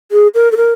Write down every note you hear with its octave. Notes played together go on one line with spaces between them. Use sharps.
G#4
A#4
A4
A#4